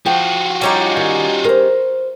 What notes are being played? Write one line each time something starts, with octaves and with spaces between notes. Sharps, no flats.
F3 F4 F#4 G5
G3 C#4 D#4
D#3
A#4 C5